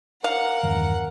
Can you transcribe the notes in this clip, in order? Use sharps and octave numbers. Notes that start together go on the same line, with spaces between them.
A#4 F5 F#5
E2 G2 D#3